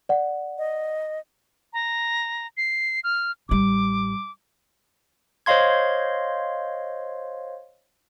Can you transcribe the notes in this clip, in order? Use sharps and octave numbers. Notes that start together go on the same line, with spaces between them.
D5 F#5
D#5
A#5
C7
F6
A1 G3 D6
C5 C#5 D#5 F5 C6 G#6